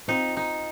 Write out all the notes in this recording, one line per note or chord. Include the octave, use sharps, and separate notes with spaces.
C4 D#4 F4
D#4